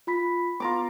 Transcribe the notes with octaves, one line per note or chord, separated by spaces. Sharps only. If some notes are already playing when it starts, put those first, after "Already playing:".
F4 B5 B6
B3 F4 A#5 D6